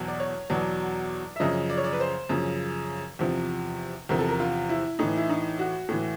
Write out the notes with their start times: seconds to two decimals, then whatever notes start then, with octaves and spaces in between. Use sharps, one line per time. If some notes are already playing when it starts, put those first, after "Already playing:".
Already playing: E2 B2 F#3
0.08 D5
0.20 C#5
0.50 E2 B2 F#3 D5
1.36 E5
1.40 F#2 C#3 F3 D#5
1.70 D5
1.78 C#5
1.84 D5
1.93 B4
2.00 C5
2.29 F#2 C#3 F3
3.19 E2 C3 F3
4.09 E2 C3 F3 A#4
4.19 A4
4.29 A#4
4.40 F4
4.69 E4
4.99 A2 E3 D#4
5.17 E4
5.30 D#4
5.59 F#4
5.89 A2 E3